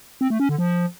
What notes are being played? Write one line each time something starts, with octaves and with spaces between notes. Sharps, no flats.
C4
A3
C#4
D3
F3